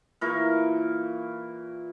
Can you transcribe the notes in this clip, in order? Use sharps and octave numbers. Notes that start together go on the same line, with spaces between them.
A#2 E3 A#4 C#6